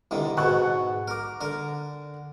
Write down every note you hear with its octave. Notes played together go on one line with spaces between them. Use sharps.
C2 D3 D#3
G#2 B2 F#5 A5 C#6 F#6
A#4 D6
D3 A#4